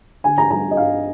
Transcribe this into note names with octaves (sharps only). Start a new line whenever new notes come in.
D3 G#5
A#5
G3 A#5
D#5
G2 F5